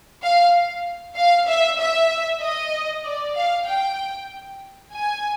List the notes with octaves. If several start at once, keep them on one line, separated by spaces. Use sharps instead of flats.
F5
F5
E5
E5
D#5
D5
F5
G5
G#5